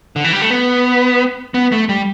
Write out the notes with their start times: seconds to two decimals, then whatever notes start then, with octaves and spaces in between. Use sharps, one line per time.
0.16 D3
0.24 E3
0.33 G3
0.42 A3
0.50 B3
1.54 B3
1.72 A3
1.89 G3